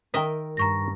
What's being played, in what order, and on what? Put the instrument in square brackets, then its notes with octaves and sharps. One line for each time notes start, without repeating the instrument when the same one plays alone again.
[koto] D#3 D#5 E5 [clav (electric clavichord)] A#4 G5
[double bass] G2 [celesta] A#5 C#6 A#6